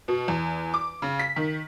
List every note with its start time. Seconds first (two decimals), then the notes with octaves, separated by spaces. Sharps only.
0.08 B2
0.28 E2
0.74 D6
1.02 C#3
1.19 B6
1.36 D#3